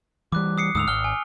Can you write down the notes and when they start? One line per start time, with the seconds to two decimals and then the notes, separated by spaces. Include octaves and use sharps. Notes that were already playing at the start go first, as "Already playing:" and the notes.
0.32 E3 G3 D6 F#6
0.58 D#6 C7 C#7
0.75 D2 G#2 D#6 E6 F7
0.88 G#1 F6 G7
1.04 G#5